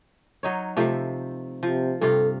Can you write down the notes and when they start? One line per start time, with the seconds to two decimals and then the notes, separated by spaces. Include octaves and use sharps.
0.43 F#3 D#4 C#5
0.77 C3 F3 A3
1.63 C3 F3
2.01 G2 C3 F4 A4